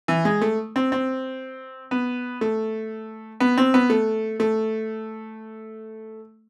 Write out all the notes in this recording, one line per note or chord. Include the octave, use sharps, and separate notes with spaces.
E3
G#3
A3
C4
C4
B3
A3
B3
C4
B3
A3
A3